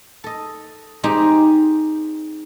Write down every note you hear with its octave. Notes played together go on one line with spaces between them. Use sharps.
A4 D#5
G#3 C4 D#4 G4